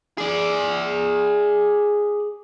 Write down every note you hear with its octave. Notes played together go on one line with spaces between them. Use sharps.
G#4 D5